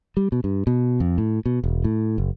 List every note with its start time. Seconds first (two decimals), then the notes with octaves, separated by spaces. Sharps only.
0.17 G3
0.32 B2
0.44 G2
0.67 B2
1.00 F2
1.18 A2
1.46 B2
1.64 E1
1.84 A2
2.18 F#1